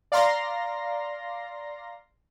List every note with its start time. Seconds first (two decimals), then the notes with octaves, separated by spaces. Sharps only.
0.12 D5 F5 A#5 C6 A#6